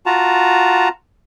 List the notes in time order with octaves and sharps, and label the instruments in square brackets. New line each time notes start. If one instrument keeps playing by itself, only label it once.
[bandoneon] F4 F#4 A5 A#5